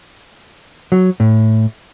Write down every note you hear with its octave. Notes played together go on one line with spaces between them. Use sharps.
F#3
A2